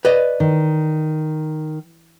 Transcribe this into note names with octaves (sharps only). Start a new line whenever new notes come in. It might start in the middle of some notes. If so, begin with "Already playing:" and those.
B4 D5 D#5
D#3